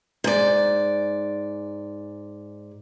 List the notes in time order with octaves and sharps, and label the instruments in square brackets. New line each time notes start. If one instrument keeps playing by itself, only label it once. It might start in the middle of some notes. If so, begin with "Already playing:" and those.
[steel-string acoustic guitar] G#2 D5